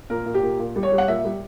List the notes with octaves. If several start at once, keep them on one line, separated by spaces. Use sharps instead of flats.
A#2 A#4
A#2
G4
A#2
A#2
G3
C#5
G3
F#5
A#2 E5
G3